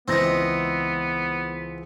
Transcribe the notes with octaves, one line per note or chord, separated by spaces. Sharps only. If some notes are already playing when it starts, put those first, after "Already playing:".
C#2 E3 B3 C4 D#4 A#6